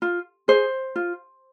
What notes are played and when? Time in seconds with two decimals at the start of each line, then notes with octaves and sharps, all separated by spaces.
0.02 F4
0.48 G#4 C5
0.96 F4